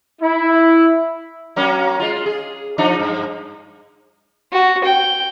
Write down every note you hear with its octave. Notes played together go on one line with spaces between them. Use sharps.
E4
F#3 A#3 C#4
G#3 F4
G#4
F3 D4 D#4
G2
F#4
G5